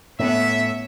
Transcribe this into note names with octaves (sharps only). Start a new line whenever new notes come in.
A2 B3 C#4 E5